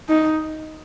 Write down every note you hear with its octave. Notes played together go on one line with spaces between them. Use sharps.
D#4